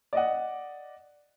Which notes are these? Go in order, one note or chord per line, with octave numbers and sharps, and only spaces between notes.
D5 D#5 F#5